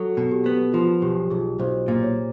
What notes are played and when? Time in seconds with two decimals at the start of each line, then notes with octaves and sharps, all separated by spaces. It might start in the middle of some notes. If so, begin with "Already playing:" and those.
Already playing: F#3 A4
0.17 B2
0.32 G4
0.46 B3
0.73 F3 F4
1.02 B1 G4
1.30 B1 G#4
1.59 B1 C5
1.88 A#2
2.03 C#5